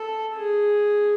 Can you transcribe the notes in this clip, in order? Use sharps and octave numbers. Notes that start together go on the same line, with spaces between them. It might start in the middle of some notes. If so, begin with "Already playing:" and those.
Already playing: A4
G#4